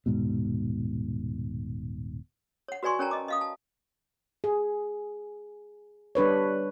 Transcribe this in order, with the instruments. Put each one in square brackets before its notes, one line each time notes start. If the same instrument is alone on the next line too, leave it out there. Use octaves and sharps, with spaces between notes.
[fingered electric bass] D#1 G#2 B2
[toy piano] C#5 F#5
F#4 B4 D5 G#5 C6 C#6
C#4 A#4 C#5 G5 A5 A#5
D#5 D6
D#5 F5 D#6
A5
[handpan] G#4
G3 D4 B4 C#5